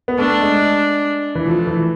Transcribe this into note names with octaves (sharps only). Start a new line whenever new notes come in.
B3
A3 D4
G#3
E3
F3 A3
E3